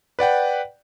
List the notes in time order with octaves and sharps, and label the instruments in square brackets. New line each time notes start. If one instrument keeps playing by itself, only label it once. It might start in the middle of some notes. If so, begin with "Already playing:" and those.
[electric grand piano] B4 D5 F#5 G5